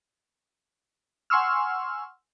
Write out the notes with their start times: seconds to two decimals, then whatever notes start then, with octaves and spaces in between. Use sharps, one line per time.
1.30 F#5 G#5 C6 C#6 E6 F6